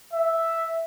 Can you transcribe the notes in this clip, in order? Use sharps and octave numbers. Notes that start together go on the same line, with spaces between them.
E5